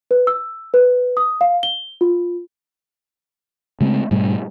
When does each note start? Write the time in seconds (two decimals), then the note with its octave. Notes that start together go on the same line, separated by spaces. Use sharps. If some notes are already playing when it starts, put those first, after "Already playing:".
0.11 B4
0.27 E6
0.74 B4
1.17 D#6
1.41 F5
1.63 G7
2.01 F4
3.81 C#3 G#3 A3 C4
4.11 G#2 B2 G3 A3